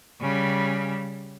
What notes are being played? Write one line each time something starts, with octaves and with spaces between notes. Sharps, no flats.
C#3 G3